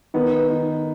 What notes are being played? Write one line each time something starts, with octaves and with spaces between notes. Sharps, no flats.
D#3 B3
D#3